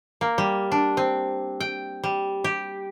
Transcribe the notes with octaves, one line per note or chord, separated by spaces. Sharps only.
A#3
G3
D4
C4
G5
G3
G4